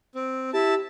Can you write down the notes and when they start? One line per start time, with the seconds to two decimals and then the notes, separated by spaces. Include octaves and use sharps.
0.15 C4
0.54 E4 G4 A5